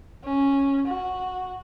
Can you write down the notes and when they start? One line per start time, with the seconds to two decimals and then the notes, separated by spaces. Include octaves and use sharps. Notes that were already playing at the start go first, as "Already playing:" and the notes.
0.25 C#4
0.88 F#4